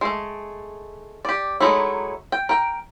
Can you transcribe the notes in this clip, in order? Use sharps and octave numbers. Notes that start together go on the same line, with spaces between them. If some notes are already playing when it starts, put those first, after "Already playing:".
G#3 A3
G4 D5
F#3 G#3 A3 D#4 E4
G5
A#4 G5